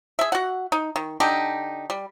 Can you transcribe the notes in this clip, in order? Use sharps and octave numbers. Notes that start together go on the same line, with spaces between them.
G#4 E5
F#4 F#5
D#4
D#3
D3 D4 D#4 G4
G3